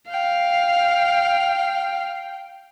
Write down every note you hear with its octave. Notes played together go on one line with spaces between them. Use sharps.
F5 G5